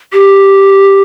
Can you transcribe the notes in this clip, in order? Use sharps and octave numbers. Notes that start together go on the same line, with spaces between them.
G4